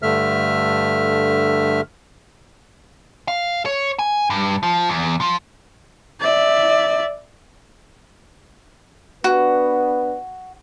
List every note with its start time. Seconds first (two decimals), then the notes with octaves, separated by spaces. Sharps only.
0.02 G2 D3 A3 E5 F6
3.28 F5
3.66 C#5
3.99 G#5
4.30 G2
4.63 F3
4.90 E2
5.21 F3
6.21 D5 E5
9.24 B3 D4 F#4 B4